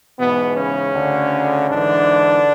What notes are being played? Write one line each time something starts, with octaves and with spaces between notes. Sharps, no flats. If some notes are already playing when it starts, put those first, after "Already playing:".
G#2 B2 E3 B3
C#3 C#4
D2 D3
G#2 D3 E3 D4